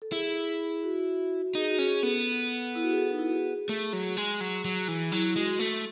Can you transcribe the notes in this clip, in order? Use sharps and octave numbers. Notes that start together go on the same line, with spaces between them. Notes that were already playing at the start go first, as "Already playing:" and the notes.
A4
E4 G#4
F#4
D#4 G#4
F#4
C#4 G#4
G#4
B3 A4
E4
F#4
G#4
A4
D#4
E4
F#4
G#4
A3
F#3
G#3
F#3
F#3
E3
F#3 E4
G#3 F#4
A3 A4